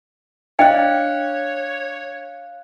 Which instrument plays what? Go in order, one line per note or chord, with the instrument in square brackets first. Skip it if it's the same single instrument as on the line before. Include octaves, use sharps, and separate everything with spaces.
[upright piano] D4 [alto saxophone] C#5 [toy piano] D#5 G5 [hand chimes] F5 F#6